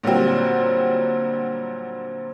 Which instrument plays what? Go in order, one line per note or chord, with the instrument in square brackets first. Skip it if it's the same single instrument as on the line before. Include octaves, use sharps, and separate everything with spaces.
[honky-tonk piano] A#2 D3 F#3 G3 C4